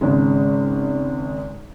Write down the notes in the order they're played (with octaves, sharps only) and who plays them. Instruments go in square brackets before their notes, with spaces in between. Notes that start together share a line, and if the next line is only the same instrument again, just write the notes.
[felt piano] G#1 C#3 G#3